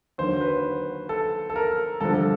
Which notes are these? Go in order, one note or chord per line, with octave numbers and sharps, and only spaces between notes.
D#2 D3 F#3 C5
B4
A4
A4
A#4
G2 D3 F3 A4
A4